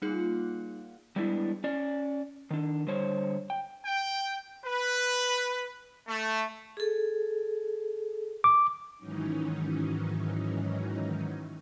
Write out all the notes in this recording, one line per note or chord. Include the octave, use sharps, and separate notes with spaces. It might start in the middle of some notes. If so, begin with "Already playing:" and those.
A#2 G3 D#4 G#4 F#5
G3 G#3 B3 D4 E4
C#4 D5
D#3 D4
D3 G3 C5 C#5
G5
G5
B4
A3
G#4 A4
D6
G#2 D#3 E3 F#3 C#4 D#4